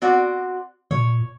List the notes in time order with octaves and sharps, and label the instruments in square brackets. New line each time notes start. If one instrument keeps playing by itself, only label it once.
[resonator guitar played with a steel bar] C4 F#4 D5
[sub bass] A#2 [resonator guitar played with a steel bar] C#5